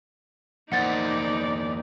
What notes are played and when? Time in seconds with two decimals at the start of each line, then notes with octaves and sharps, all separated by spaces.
0.72 E2 A#3 D#4 C5 D5 F#5 A6